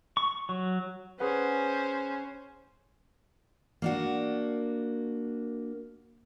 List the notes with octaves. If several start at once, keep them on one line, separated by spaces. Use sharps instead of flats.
C#6
F#3
C#4 G#4 B4 C5 F#5
A#3 D4 F#4